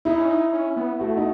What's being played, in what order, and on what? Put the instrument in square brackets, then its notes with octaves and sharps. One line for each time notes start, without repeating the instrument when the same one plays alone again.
[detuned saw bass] D#4 [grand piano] E4
[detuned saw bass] C#4
D#4
C#4
B3
[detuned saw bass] A3 [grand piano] F#4
[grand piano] D#4